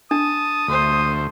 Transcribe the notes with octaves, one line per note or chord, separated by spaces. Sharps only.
D4 A5 D#6
D2 A3 C5